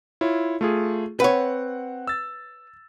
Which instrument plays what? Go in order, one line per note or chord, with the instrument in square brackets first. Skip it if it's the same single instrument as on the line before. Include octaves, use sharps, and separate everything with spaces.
[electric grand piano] E4 F4 C#5
A3 F4 G#4
[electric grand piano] C4 F#5 [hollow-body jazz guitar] B4 C#5
[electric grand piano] E6 A6